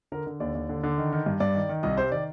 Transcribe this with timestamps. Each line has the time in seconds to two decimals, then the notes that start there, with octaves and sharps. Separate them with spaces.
0.12 D3 A#4
0.26 D3
0.40 D#2 D5
0.55 D#2
0.69 D3
0.83 D3
0.98 D#3
1.12 D#3
1.26 G2
1.40 G2 D5
1.55 D#3
1.69 D#3
1.83 C2 D#5
1.97 C3 C5
2.12 D#3 D5